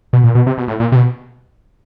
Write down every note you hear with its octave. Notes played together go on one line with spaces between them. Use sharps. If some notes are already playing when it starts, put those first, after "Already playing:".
B2
A#2
B2
C3
B2
A2
A#2
C3
B2